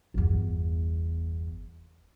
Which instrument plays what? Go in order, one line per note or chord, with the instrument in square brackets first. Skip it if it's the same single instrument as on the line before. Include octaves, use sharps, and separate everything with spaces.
[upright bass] G1 E2